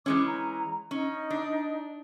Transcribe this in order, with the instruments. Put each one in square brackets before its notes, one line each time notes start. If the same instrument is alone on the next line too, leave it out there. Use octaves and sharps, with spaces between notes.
[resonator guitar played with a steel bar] E3 G#3 C#4 [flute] D6
[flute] A#5
[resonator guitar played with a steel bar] C#4 [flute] D#4
[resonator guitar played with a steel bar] D4